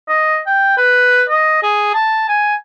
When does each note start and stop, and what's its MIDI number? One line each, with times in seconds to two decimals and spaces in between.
0.08 0.40 75
0.47 0.76 79
0.78 1.23 71
1.29 1.58 75
1.63 1.92 68
1.94 2.24 81
2.28 2.55 80